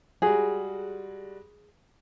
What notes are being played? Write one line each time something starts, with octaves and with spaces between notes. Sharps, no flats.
G3 G#3 F#4 G#4